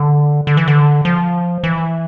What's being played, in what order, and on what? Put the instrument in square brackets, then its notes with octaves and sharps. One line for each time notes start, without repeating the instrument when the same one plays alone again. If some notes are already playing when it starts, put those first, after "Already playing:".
Already playing: [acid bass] D3
D3
E3
D3
F3
E3